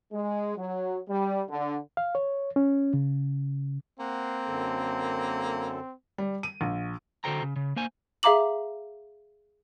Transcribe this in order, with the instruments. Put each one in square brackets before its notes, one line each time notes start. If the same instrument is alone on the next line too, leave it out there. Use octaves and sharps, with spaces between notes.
[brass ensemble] G#3
F#3
G3
D3
[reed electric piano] F5
C#5
C#4
C#3
[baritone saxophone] A#3 [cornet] C4 [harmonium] F#5
[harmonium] F#2 D3 A4
[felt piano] G3
D#7
A#1
[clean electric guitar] D3 F#4 A4 C5 G5 A#5
C#3
C#3
A#3 C5 G#5
[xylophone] G#4 E5 F5 A#5 D6 F#7